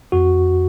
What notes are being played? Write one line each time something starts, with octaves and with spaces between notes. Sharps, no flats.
F2 F#4